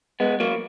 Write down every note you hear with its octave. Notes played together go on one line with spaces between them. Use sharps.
G#3 B3
F#3 A#3